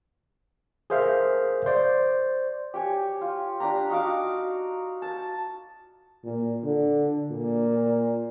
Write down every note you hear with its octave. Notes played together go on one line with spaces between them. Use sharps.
G#4 A#4 C5 E5 F5
C5 D5
G4 C#5 G#5
F4
D4 G4 A#5
D#4 F#4 F5 D6
A5
A#2
D3
A#2